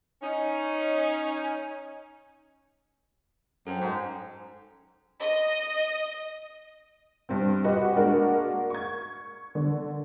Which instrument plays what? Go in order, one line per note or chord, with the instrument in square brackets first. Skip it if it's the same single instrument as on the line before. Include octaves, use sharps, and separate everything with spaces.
[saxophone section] C#4 D#4
[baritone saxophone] F#2 [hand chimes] A4 C5 G5
[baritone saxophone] G#2
[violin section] D#5
[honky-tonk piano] G2 C4
F#4 G4 B4 D#5 F#5
G#3 A#3 D4 F#4 A#4
C#6 G#6
D3